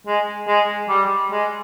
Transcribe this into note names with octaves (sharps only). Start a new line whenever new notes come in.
G#3
G#3
G3
G#3